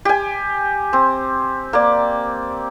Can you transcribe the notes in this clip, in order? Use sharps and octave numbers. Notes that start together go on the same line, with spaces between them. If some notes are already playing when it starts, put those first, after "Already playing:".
G4 G#5
C4
A#3 D5